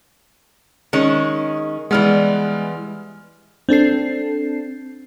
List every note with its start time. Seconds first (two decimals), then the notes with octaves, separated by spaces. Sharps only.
0.93 D#3 G#3 C#4
1.91 E3 G3 G#3 B3 F6
3.69 C4 D4 A4 C7